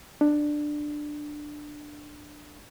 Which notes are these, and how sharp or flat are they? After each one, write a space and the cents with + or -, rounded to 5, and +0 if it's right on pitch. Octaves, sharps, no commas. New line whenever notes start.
D4 +15